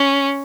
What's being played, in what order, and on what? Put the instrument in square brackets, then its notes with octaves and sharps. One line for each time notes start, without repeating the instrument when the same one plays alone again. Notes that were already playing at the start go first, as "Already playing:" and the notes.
Already playing: [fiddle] C#4